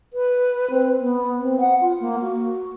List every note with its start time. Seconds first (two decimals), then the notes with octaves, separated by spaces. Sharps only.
0.13 B4
0.70 C4
1.00 B3
1.39 C4
1.60 F#5
1.81 F4
2.00 A#3
2.22 F#4